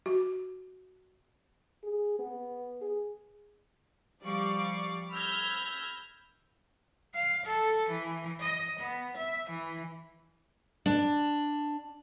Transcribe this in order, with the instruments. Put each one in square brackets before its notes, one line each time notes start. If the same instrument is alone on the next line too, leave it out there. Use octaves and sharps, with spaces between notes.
[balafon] F#4
[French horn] G#4
B3
G#4
[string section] F3 G3 D5 F5 C#6 D6
B5 E6 F6 G6 G#6 A#6
[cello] F5
A4
E3
D#5
B3
E5
E3
[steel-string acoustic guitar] D4